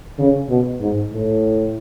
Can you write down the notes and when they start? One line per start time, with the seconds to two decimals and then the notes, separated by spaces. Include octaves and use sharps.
0.18 C#3
0.49 B2
0.80 G#2
1.11 A2